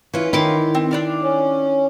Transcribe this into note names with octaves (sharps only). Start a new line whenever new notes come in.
E3 C#4 F4
D#3 E4 C6 D6
C4
D4 D5 F5
C#4